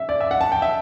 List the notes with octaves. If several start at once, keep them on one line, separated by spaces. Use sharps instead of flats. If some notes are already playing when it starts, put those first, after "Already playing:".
Already playing: E5
D5
E5
F#5
A5
G5
E5